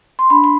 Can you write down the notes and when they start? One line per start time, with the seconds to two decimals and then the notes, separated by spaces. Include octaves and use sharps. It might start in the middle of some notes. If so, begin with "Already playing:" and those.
0.19 C6
0.30 D4 B5
0.44 C6